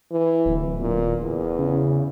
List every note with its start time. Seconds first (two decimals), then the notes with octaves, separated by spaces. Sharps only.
0.11 E3
0.46 D1
0.81 A#2
1.22 E2
1.59 C#3